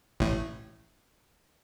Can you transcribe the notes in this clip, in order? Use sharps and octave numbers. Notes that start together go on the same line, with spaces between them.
A1 A2